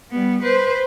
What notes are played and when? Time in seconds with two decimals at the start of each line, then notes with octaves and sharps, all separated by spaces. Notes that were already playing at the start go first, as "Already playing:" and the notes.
0.11 G3 B3
0.42 B4 C5